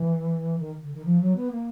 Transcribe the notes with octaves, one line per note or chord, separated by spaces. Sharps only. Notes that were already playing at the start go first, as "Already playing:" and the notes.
Already playing: E3
D#3
D3
D#3
F3
F#3
B3
A#3